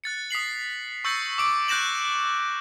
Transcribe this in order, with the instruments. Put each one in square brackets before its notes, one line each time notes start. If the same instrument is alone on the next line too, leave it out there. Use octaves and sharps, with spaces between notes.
[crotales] F#6 A6 C#7
D#6 B6 C7 F#7
C#6 E6 G6 A6 A#6 C#7
D6 D#6 D7
F#6 G6 A#6 E7 F#7